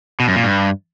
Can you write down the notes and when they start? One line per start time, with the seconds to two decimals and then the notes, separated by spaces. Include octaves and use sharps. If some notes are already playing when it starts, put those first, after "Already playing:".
0.20 B2
0.28 F#2
0.36 A#2
0.44 G2